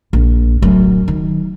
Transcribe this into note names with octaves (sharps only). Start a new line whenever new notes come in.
A#1
D1 F#2
D#3